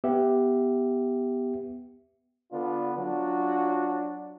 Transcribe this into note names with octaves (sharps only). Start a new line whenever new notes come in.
B3 G4 E5
D3 B3 D4 F4
F#3 D4 F4 F#4